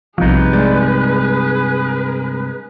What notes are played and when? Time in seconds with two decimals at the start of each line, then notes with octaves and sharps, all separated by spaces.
0.18 B1 G2 C3 F3 D#4 G#4 B4
0.53 G#3 D5